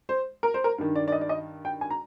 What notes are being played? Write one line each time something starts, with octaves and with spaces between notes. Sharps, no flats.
C5
A#4
C5
A#4
G2 D#3
D5
D5
D#5
D5
D#5
G5
G#5
A#5